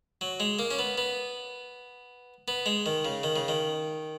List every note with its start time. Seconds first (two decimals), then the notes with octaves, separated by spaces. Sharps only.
0.21 F#3
0.40 G#3
0.59 A#3
0.71 C#4
0.79 B3
0.98 B3
2.48 B3
2.66 G#3
2.86 D#3
3.05 C#3
3.23 D#3
3.36 C#3
3.48 D#3